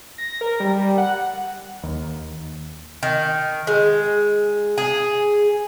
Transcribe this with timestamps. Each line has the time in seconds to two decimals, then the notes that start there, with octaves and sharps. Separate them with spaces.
0.18 A#6
0.41 A#4
0.60 G3
0.78 G3
0.98 F#5
1.83 D#2
3.03 D#3
3.67 G#3
4.78 G#4